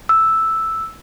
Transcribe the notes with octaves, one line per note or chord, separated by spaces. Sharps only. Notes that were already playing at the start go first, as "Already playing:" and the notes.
E6